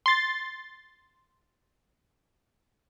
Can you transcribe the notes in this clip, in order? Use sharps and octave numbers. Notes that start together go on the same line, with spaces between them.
C6 A6